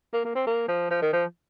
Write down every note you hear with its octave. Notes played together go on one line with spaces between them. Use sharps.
A#3
A#3
C4
A#3
F3
F3
D#3
F3